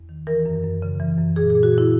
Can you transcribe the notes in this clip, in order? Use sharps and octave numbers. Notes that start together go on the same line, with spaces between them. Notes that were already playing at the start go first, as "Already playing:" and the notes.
Already playing: E2
D#3
E3 A#4
F#2
F#2
C#3
E3
F#2
A#2 G#4
G#4
A#2
F#4
A#2
E4